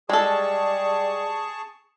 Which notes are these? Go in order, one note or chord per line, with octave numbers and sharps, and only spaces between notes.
G3 G#3 G#4 A4 A5 C#6